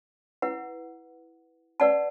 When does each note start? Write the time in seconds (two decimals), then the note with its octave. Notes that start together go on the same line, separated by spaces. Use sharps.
0.42 E4 B4 F#5
1.80 B4 D5 F#5 A5